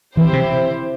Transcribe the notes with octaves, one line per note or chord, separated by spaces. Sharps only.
E3 C4 E4 G4 C5
C3